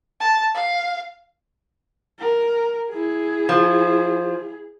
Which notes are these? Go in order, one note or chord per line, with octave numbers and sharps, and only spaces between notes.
A5
F5
A#4
E4 G#4
F3